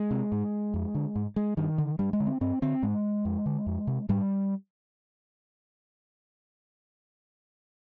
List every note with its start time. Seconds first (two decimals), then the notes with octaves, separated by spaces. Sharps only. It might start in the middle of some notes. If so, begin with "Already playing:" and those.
Already playing: G#3
0.11 C3
0.32 G#2
0.74 F2
0.95 D3
1.16 G#2
1.36 G#3
1.57 G2 D#3
1.78 D3
1.99 G2 G3
2.13 G#3
2.20 D3
2.27 C4
2.41 G2 C4
2.62 D3 C4
2.83 G#2 G#3
3.25 F2
3.46 D3
3.66 F2
3.87 C3
4.09 G#2 G3